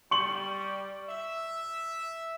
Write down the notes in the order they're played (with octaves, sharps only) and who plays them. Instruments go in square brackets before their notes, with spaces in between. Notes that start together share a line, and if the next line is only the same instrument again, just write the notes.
[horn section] G3 [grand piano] C#6 F#7
[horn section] E5